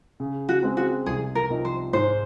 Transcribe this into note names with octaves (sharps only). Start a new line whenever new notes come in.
C#3
F#4
G#3 C4
F#4
C2 G#4
A#4
C3 F3 C4 D#4
C5
G#2 C5